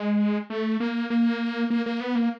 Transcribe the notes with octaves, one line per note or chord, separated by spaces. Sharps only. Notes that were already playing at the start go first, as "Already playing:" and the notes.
Already playing: G#3
A3
A#3
A#3
A#3
A#3
B3
A#3